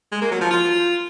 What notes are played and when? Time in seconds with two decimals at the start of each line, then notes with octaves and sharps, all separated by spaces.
0.12 G#3
0.21 A#3
0.31 F#3
0.41 F3
0.51 F4